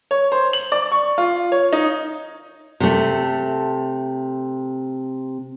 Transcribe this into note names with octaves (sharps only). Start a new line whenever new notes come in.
C#5
C5
F#7
D5
C#6
F4
C#5
D#4
C3 A3